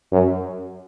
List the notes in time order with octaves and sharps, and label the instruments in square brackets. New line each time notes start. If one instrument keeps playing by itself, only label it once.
[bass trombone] F#2